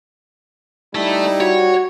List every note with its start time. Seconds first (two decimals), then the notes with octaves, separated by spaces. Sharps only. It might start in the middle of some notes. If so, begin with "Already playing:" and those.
0.95 G3 A3 D#4 E4
1.41 F#4 C#5